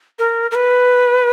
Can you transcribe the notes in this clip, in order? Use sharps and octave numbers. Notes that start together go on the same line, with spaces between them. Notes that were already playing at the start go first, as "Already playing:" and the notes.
A#4
A#4
B4